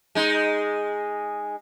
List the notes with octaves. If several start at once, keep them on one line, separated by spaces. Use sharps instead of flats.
G#3 D#4